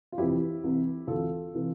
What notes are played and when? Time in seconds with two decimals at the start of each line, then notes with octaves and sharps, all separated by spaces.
0.12 F4
0.18 F2 C3 E3 E4 G4
0.63 C2 C3 E3
1.07 D2 C3 E3 F4 A4
1.54 C3 E3